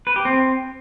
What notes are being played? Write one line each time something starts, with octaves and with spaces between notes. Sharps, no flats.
B4
G4
C4